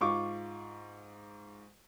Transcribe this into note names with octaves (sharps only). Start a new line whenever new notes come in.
G#2 F4 C#6 D6